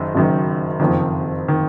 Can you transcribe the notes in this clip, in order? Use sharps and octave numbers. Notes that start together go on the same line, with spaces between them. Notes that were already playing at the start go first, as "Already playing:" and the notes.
Already playing: F#1 F#2 D#3
F#1 F#2 D#3
F#1 F2 D#3
D#3